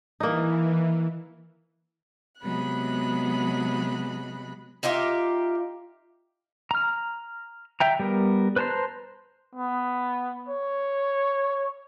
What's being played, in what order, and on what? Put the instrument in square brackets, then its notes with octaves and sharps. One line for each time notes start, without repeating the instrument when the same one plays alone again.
[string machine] E3 [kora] A#3 D#4
[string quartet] C3 F#3 G#3 B3 B5 F#6
[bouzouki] D#4 F4 G4 E5
[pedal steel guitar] A#5 F6
E5 G5 A#5
G3 B3 A#4
B4 C5 A5 A#5 C6
[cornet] B3
C#5